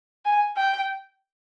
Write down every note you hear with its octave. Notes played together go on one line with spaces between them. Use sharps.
G#5
G5